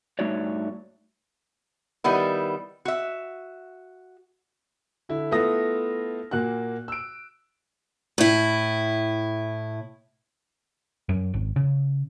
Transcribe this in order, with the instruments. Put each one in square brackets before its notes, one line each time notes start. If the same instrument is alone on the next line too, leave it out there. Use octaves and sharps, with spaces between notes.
[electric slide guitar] G2 A3 D#4 F#4 C#5 D5
[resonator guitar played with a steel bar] D#3 G3 B3 E4
F#4 E5
[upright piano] D3 E4
A3 B3 E4 F4 D#6 A#6
A#2 A#3 F#4 F#6
E6 D7
[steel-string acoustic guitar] A2 E4
[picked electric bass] F#2
G#1
C#3